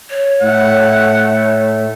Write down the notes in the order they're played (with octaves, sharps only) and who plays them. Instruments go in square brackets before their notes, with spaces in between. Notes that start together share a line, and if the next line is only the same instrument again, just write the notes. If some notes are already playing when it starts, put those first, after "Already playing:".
[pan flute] C#5
[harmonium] A2 [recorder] A3 [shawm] F#5